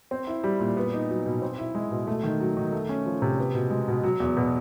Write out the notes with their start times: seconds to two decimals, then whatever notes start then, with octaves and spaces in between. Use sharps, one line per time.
0.11 C4
0.27 E4
0.44 G3
0.60 A#2
0.77 B3
0.93 D#4
1.10 F#3
1.26 B2
1.42 C4
1.58 E4
1.75 G#3
1.91 B2
2.07 A3
2.23 D#3
2.40 F#3
2.57 D#3
2.73 A3
2.89 C#4
3.06 F3
3.22 C3
3.38 B3
3.54 B2
3.70 G#3
3.88 B2
4.03 F#3
4.20 E2
4.37 B2